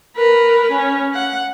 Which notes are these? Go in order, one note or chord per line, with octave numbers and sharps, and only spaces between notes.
A#4 B4
C#4
F#5